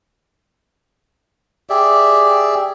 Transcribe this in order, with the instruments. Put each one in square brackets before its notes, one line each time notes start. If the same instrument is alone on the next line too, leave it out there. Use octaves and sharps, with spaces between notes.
[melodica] G4 G#4 D5 E5